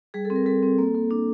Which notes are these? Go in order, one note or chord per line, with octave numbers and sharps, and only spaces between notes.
G3 G#4
A4
C4
A#4
G3 A4
C4
A#3
A#3
D4